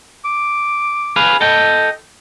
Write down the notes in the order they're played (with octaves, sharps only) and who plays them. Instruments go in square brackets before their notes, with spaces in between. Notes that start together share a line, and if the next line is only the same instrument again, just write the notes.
[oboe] D6
[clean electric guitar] G#4 B4 F5
[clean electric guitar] A4 G5 [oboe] D#5